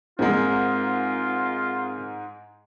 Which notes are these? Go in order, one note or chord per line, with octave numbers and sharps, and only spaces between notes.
G#2 G#3 C4 F4 A#4